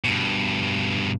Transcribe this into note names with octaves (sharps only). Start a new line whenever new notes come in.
G2 B2